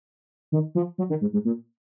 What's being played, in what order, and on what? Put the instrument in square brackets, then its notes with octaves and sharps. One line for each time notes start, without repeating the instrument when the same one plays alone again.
[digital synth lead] D#3
F3
F#3
D#3
G#2
G#2
A#2